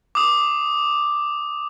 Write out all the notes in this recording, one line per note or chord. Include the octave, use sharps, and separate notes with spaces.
D6 D#6